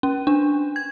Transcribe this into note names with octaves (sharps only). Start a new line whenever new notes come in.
C#4
D4
G#6